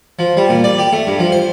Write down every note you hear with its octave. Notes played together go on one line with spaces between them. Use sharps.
F3
G3
A#2
D5
G4
A3
G2
F3
C5